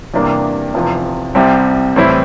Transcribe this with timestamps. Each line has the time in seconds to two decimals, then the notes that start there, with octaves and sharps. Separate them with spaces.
0.14 E2 C3 G3 A#3 D4
0.74 F1 E2 C3 F3
1.35 C2 C3 G3 C4
1.96 A2 E3 G3 C4 E4